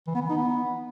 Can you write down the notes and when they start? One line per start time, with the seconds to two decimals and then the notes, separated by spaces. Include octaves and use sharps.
0.07 E3
0.15 B3
0.22 E3
0.29 D#4
0.37 B3